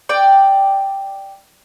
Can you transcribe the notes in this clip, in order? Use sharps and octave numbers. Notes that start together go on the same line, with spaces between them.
D5 G5